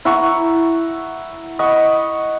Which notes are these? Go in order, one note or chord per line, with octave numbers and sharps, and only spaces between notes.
E4 F#5 A#5 C#6
D#5 F#5 B5 C#6